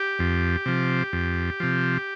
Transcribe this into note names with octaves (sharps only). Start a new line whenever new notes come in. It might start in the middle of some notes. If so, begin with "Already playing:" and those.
Already playing: G4
F2
C3 F3
F2
C3 F3